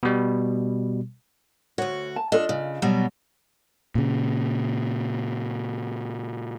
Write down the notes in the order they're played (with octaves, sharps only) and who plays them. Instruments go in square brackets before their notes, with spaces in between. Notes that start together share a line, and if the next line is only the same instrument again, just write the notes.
[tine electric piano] B2 G3
[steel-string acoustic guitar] D2 F#4 [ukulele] C#5
[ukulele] A5
[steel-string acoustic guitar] D4 [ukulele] F4 A4 D#5
[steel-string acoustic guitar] C#3
B2 F#3 G3
[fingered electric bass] A#2 C#3